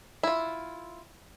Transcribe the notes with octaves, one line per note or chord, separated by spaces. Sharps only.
E4 F4